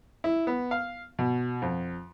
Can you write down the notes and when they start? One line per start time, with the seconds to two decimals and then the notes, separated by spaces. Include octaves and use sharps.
0.24 E4
0.47 B3
0.71 F5
1.19 B2
1.62 F2